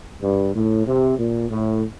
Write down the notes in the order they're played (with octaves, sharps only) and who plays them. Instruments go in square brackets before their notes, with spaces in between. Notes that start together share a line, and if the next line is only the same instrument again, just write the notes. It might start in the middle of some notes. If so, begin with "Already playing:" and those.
[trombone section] G2
A2
C3
A#2
A2